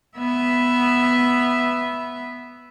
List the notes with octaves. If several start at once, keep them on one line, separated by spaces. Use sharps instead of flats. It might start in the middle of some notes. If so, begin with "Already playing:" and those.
B3 E5